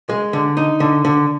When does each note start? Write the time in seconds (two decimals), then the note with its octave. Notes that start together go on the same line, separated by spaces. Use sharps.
0.09 G#3
0.33 D3
0.57 D#4
0.80 D3
1.05 D3